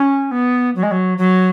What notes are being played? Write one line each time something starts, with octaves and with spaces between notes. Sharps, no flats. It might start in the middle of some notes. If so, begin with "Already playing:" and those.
Already playing: C#4
B3
F#3
G#3
F#3
F#3